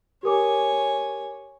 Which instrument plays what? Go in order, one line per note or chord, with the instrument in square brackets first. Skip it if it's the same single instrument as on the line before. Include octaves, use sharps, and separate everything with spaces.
[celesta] G4 A#4 D6 [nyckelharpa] C#5 G#5